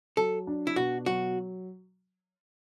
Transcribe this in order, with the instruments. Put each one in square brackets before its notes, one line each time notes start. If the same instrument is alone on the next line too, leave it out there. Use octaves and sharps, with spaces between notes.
[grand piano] F#3 [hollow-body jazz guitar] A4
[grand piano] D4
[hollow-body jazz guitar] E4
[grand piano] B2 [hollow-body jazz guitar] F#4
[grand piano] F#3 [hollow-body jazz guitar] F#4